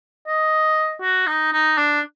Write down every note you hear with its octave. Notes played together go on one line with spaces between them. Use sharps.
D#5
F#4
D#4
D#4
D4